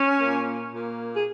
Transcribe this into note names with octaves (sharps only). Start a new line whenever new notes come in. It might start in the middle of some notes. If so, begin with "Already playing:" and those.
Already playing: C#4
A#2 A#3
A#2 A#3
G#4